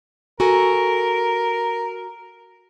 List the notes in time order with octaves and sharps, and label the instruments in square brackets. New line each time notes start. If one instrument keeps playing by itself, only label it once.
[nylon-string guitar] F#4 A4 G#5 [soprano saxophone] A#4